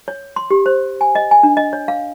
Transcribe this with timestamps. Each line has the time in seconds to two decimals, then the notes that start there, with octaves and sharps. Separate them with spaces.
0.08 C#5
0.36 C6
0.51 G4
0.66 C5
1.01 G#5
1.15 D#5
1.31 G#5
1.43 D4
1.57 D#5
1.73 C#5
1.88 F5